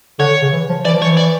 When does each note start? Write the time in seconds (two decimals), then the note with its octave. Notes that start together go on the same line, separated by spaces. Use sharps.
0.19 D3 C#5
0.42 C#3
0.53 E3
0.69 F3
0.85 E3 D5
0.94 F3
1.02 E3 C#5
1.17 D5